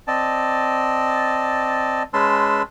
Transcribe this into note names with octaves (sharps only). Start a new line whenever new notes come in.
C4 D5 D#5 A5
G#3 C#4 B4 A5 C6 E6